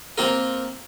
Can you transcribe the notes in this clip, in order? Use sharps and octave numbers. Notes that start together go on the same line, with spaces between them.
A#3 C4 F4 A#4